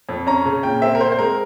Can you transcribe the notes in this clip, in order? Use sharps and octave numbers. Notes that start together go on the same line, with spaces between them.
F2
C#4 A#5
C#3
A#2 G5
C4 E5
A#4
C4 C5
C5
G#3 A#4